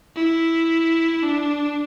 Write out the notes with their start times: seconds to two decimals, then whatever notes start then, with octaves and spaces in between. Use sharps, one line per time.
0.16 E4
1.23 D4